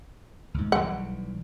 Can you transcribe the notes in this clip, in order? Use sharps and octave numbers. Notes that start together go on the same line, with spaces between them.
D2 G#2
B1 E3 G3 F#5